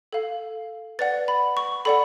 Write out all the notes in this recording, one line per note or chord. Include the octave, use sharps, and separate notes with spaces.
A4 F5
B4 D5 F#5 A6
B5
C#6
A4 D5 F#5 B5